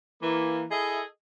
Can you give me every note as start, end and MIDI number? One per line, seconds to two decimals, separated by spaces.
0.22 0.64 52
0.22 0.64 58
0.70 1.01 64
0.70 1.01 68
0.70 1.01 69
0.70 1.01 75
0.70 1.01 76